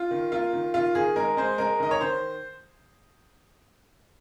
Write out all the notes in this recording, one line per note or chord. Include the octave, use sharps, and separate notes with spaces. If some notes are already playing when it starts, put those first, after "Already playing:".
Already playing: F4
D#3
A#3 F4
D#3
D#3 F4
D#3 G#4
G#3 A#4
G#3 C5
G#3 A#4
D#3 D#5
C#5
D#3 C5